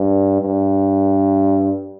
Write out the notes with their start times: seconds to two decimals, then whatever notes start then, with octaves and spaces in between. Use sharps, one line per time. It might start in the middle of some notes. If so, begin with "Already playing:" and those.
Already playing: G2
0.41 G2